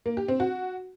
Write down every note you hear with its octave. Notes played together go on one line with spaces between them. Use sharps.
A#3
G4
C4
F#4